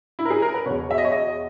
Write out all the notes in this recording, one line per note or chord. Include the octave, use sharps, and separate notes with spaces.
E4
A#4
G#4
A#4
B4
E2 B2 C#5
E5
D#5
C#5
D#5